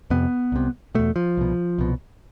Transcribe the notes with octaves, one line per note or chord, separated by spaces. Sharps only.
F2 C3 B3
C2 C3
E2 B2 A3
F3
C2 B2
C2 B2